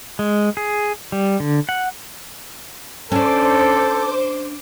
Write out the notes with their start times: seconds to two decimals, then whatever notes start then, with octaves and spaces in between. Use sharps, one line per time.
0.19 G#3
0.57 G#4
1.12 G3
1.40 D3
1.69 F#5
3.12 C#4 D4 A4 C5 D6